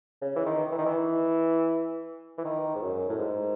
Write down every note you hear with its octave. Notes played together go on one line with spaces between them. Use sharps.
C#3
E3
D#3
E3
D#3
E3
E3
D#3
G#2
F#2
A2
G#2